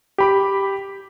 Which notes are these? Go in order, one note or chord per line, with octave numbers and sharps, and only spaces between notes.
G4 B5 D6